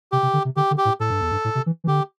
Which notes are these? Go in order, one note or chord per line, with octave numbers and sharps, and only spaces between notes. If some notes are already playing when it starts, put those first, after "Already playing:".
C3 G4
C3
D3
C3
D3 G4
D3
G4
A2
A2 A4
G2
E2
G2
A2
C3
E3
E3
D3 G4